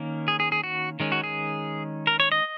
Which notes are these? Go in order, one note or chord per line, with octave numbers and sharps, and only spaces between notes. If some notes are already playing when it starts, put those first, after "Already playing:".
Already playing: D#3 A#3 C#4
G#4
G#4
G#4
F#4
D#3 G#3 C#4
F#4
G#4
A#4
C#5
D#5